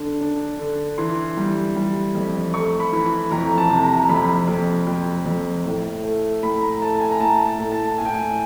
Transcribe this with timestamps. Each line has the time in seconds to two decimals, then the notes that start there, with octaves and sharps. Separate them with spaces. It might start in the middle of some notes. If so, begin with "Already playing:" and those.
Already playing: D3 D4
0.21 D4
0.59 D3
0.98 E3 C6
1.37 G3
1.76 G3
2.15 F2
2.53 A3 C#6
2.80 B5
2.93 E3
3.06 B5
3.31 F2 A#5
3.58 A5
3.70 C3
3.83 A#5
4.09 F2 B5
4.48 F2
4.87 F2
5.26 F2
5.65 A2
6.04 A3
6.42 A2 B5
6.62 A#5
6.81 A3 A5
7.00 G#5
7.11 A#5
7.20 A2 A5
7.46 A5
7.59 A2
7.72 A5
7.98 A2 G#5
8.05 G5
8.13 G#5